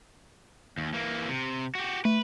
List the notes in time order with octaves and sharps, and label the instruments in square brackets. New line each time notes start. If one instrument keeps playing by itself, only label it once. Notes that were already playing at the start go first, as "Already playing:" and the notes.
[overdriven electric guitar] D#2
E3 A#3
C3
F#4 G4
[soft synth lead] A3 [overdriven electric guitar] B4